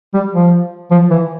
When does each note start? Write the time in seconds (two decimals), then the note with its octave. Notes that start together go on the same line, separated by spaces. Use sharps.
0.14 G3
0.33 F3
0.91 F3
1.11 E3